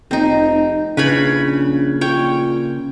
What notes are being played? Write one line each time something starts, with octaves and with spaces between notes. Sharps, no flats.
F1 C4 D#4
A#1 C#3 B4 C#5 B5
A#2 C#5 G5